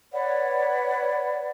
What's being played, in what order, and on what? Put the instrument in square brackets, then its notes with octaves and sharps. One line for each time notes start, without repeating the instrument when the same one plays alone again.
[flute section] B4 C#5 D5 F#5